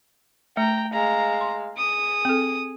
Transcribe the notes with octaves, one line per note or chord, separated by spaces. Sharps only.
A3 G5 A#5
G#3 F5 A#5
C6
G#4 D#6
C4 A4